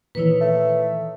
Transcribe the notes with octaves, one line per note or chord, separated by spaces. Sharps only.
A#2 D#3 E3 B4 C#5
A3